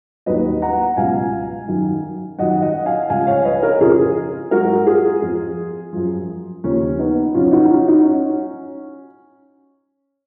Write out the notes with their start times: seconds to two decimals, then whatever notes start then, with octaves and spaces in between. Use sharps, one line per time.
0.26 D#2 D#3 F#3 B4 D#5
0.62 F#5 A#5
0.97 C#2 B2 F#3 F5 G#5
1.68 F#2 D#3 F#3
2.38 F#2 D#3 F#3 D#5 F#5
2.62 D#5 F#5
2.86 F5 G#5
3.09 C#2 C#3 F3 F5 G#5
3.27 C#5 F5
3.45 B4 D#5
3.63 A#4 C#5
3.80 F2 C#3 F3 F4 G#4
4.51 G#2 F#3 F#4 A#4
4.87 F4 G#4
5.22 F2 F3
5.93 F#2 F3
6.64 D#2 C#3 F3 C#4
6.99 B3 D#4
7.34 F2 C#3 F#3 C#4 F4
7.52 D#4 F#4
7.70 C#4 F4
7.88 D#4 F#4
8.05 C#4